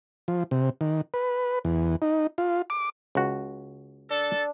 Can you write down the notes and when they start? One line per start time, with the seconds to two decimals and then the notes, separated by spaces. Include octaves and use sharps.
0.28 F3
0.51 C3
0.81 D#3
1.14 B4
1.65 E2
2.02 D#4
2.38 F4
2.70 D6
3.15 C#2 F#4
4.11 D4 A4